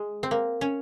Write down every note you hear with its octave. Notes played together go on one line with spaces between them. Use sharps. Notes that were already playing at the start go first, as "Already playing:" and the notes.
Already playing: G#3
C4
A#3
C#4